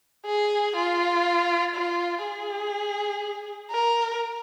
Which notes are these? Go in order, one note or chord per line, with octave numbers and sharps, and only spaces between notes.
G#4
F4
F4
G#4
A#4